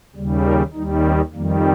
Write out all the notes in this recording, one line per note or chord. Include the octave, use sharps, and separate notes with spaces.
D#2 C#3 G3
A#4
D#2 D#3 G3 D#4
C4
F2 D#3 G3 A#3